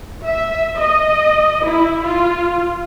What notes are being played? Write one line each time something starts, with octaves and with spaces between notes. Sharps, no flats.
E5
D#5
E4
F4